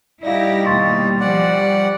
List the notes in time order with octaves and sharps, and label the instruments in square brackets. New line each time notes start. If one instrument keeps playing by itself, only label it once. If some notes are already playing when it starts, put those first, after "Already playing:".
[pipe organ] G3 [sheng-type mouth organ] D#4 [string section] E4 G4 A#6 [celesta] D5 E5 F5
[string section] D#2 B2 [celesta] C6 C#6 A6
[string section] F3 [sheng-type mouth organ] D5 F#5